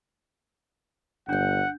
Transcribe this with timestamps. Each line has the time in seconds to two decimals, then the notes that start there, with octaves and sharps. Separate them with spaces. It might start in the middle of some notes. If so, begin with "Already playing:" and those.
1.29 G1 D4 F#5 G6